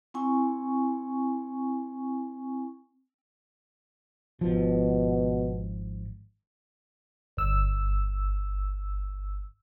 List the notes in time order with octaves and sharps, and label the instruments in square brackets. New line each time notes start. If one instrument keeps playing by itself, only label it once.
[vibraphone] C4 E4 G#5 C#6
[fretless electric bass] G#1 C#2 F3 [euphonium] B2
[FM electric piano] G1 E6